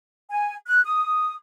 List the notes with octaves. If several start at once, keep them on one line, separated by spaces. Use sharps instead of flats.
G#5
F#6
D#6